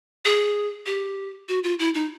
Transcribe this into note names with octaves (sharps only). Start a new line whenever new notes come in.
G#4
G4
F#4
F4
E4
D#4